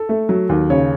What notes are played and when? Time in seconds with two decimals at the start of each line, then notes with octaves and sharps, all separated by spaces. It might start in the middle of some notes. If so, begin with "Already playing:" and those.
Already playing: A4
0.09 A3
0.29 F#3
0.49 D#2
0.70 C#3 C#5